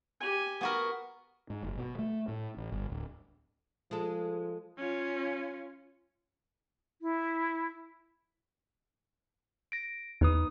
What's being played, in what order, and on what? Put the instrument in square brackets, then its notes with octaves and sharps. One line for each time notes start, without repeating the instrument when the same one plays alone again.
[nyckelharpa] G4 G#5
[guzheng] B3 F#4 A#4
[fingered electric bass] G#2
F#1
B2
A3
A2
A1
G1
D1
[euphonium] F3 [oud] G#3 A4
[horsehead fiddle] C#4 F4
[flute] E4
[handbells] A#6 D7
[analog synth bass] E2 [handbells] D#4 B4 D#6